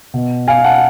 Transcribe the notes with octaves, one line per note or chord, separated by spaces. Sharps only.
B2
F5 G#5
F#5 A5